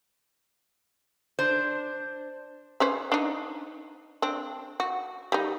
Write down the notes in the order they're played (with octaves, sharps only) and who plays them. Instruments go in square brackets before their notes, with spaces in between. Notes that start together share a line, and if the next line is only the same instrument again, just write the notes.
[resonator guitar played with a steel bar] D4 C5
[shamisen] C#4 B4 C5
D4 D#4
C4 D4
F#4
G3 D#4